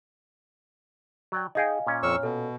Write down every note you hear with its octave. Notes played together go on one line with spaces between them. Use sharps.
F#3 D5 G5
D#4 G#4 D#5 F5 G5 G#5
A#2 C#4
F2 C#5 C#6 E6 F6
B2 A4